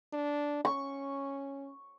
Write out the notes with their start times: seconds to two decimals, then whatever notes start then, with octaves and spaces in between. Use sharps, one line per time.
0.13 D4
0.65 C#4 C#6